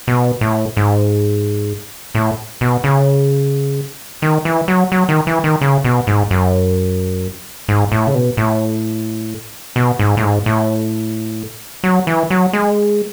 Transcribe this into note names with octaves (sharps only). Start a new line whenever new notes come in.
B2
A2
G#2
A2
B2
C#3
D#3
E3
F#3
F#3
D#3
E3
D#3
C#3
B2
G#2
F#2
G#2
A2
C#3
B2
A2
B2
G#2
A2
G#2
A2
F#3
E3
F#3
G#3